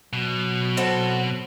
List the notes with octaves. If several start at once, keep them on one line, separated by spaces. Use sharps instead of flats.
B2 F#3
C4 A4 F#5